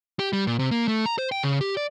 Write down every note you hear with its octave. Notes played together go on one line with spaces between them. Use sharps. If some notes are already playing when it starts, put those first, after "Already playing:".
G4
G3
A#2
C3
A#3
A3
A#5
C5
G5
C#3
G4
D5